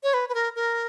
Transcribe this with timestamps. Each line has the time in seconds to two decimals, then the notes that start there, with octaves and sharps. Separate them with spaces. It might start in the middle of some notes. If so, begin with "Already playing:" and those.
0.03 C#5
0.14 B4
0.29 B4
0.34 A#4
0.56 A#4